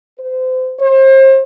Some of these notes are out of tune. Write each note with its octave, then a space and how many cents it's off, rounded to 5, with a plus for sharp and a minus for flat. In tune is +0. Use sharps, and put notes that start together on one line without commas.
C5 -30
C5 +35